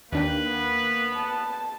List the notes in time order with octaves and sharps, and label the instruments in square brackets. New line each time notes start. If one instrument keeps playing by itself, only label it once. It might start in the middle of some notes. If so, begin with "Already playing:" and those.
[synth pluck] D#2 D4 G5 [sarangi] A#3 [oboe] B4
[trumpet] B3
[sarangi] A5